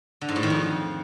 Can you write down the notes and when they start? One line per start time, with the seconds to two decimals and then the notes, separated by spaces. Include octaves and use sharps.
0.21 D3
0.29 G#2
0.36 A2
0.43 D#3
0.50 F2